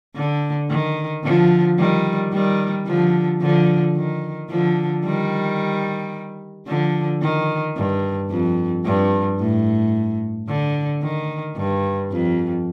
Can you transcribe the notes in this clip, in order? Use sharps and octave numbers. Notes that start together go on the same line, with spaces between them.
D3
D#3
D3 F3
D#3 G3
D#3 G3
D3 F3
D3 F3
D#3
D3 F3
D#3 G3
D3 F3
D#3
G2
F2
G2
A2
D3
D#3
G2
F2